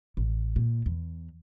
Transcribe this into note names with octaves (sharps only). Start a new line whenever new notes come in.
A1
A#2
E2